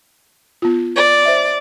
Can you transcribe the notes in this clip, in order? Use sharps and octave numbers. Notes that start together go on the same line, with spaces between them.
B3 F4
D5
C5 E5